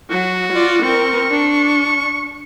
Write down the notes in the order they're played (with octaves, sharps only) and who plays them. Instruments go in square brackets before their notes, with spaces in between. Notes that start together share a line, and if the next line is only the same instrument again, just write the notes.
[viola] F#3 [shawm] F#4
[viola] F4 D5
[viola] C4 A#4 [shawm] C#6
[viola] D4